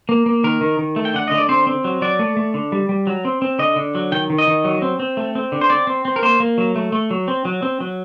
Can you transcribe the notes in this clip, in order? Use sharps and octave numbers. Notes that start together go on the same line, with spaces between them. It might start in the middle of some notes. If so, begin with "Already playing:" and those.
A#3
A#3
D#3 A#4
D#3
D#3
A3
G5
D3 F#5
D3 D#5
D5
C4 C5
C4
F#3
F#3 D5
A3
A3
D3
G3
G3
F#3
C4
C4
D3 D#5
D3
F#3
D#3 G5
D#3
D#5
D#3
F#3
C4
C4
A3
C4
D3
C5
C4 D5
C4
C4
A#4
A#3 C5
A#3
F#3
A3
A3
F#3
C4
F#3
C4
F#3